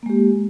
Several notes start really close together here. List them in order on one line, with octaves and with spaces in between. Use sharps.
A#3 G#3 G4